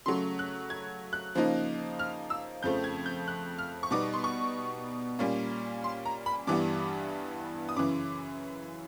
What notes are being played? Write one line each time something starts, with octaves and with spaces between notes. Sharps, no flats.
C#3 F#3 A3 C6
F#6
G#6
F#6
C#3 F3 A#3 D#4
F6
E6
F2 C#3 F3 A3 G6
G#6
G6
F#6
F6
C#6
B2 G3 B3 D#4 D6
C6
C#6
A#2 G3 A#3 C#4
C6
A#5
B5
G2 E3 G3 B3 D6
D#6
F#2 C#3 E3 D6